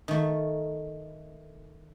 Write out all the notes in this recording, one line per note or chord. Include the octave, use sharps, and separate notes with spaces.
D#3 A3